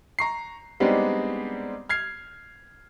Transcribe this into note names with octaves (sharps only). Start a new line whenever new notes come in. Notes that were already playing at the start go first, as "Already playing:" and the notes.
A#5 C#6 C7
G3 G#3 B3 C4 D4 D#4
F6 G#6 C7